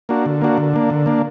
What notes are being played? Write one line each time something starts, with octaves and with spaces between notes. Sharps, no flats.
A#3 D4 F#4
D3
A#3 D4 F#4
D3
A#3 D4
D3
A#3 D4